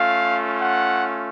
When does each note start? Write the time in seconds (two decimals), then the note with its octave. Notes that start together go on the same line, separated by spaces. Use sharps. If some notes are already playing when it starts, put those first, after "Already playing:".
Already playing: A3 C#4 F4 F5
0.57 F#5